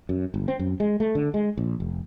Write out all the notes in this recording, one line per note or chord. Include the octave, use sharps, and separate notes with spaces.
F#2
G1
C4
F#2
G#3
A3
D3
G#3
A#1
F1